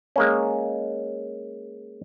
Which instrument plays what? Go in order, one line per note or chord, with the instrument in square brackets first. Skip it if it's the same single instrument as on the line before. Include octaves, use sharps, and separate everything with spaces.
[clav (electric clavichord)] G#3 A#3 C#4